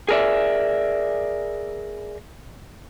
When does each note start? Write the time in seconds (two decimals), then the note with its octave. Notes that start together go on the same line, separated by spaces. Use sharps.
0.09 G#4 A#4 D5 E5